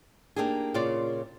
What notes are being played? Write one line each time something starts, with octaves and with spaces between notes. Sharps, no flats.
A#3 D4 D#4 G4 G#4
A#2 C#3 F4 D5